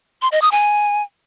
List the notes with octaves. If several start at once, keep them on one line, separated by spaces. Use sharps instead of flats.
C6
D#5
D#6
G#5